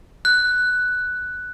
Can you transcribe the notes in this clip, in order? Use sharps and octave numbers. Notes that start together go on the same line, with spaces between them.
F#6